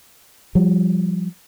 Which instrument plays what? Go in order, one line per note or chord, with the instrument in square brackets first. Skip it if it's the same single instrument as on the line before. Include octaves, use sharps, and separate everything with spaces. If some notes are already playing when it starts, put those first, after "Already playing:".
[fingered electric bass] F3 G3